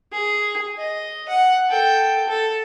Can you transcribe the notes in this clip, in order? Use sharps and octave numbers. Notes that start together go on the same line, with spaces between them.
G#4
D#5
F#5
A4 G5
A4